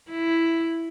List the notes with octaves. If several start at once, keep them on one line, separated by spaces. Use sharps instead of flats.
E4